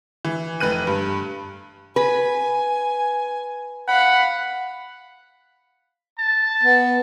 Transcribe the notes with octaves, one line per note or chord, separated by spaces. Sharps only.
E3
F1 B4 F#6 D#7
G2
B4 G#5
F5 F#5 B5
A5
B3